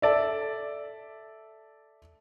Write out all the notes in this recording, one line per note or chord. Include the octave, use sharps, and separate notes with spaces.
A4 D5 E5